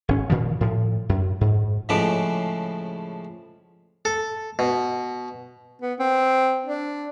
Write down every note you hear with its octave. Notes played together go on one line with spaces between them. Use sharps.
G#1 C#4
A#2 D#3 F3
A2 F3
F#2
G#2
A2 C#3 F3 G#3 B4 D6
A4
B2
B3
C4
D4